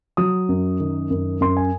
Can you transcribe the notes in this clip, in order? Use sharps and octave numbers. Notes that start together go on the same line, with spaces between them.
F#3 D#6
F#2
D#3
F#2
F#2 C6
G#5